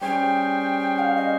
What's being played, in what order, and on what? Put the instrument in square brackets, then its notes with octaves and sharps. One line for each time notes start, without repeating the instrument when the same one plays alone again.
[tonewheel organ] G3 C#4 G#4 C5 [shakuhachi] G5
[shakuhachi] F5
D#5